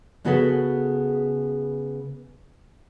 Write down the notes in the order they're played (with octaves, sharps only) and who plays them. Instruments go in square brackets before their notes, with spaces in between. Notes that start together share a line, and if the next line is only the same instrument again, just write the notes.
[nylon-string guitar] C#3 B3 F#4 G#4 A4 B4